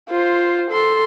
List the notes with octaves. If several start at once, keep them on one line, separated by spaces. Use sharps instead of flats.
F4 C5
A4 C6